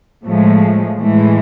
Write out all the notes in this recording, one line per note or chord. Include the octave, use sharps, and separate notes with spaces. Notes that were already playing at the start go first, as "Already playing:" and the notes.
A2 F3 G#3 A3
A2 E3 G#3 A3